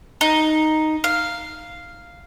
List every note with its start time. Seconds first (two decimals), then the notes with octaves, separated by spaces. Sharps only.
0.21 D#4
1.04 F5